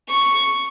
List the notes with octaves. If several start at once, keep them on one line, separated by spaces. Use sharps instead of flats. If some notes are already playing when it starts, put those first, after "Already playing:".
C#6